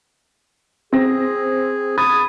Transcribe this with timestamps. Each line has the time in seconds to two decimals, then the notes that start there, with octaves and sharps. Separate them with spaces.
0.93 C4 G#4 A#6
1.98 B5 D#6 G#6 A6